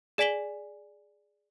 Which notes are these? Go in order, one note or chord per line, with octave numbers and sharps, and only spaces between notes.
G#4 D5 G#5 B6 F#7 G7